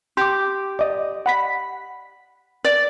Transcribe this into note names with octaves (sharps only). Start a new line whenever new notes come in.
G4 C6 D6
D5 D#5
F#5 B5 B6
D5